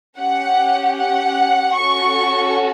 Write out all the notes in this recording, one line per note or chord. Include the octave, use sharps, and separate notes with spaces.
C#4 G4 F#5
F#5
C#4 F#4 A4 C#6